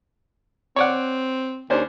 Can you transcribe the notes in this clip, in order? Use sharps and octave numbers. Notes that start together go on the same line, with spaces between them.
C4 C#5 D5 F#5
D#2 C#4 D4 C5